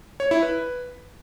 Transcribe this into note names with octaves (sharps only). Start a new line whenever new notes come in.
C#5
E4
B4